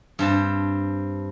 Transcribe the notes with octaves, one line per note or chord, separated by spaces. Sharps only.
G2 C4 A5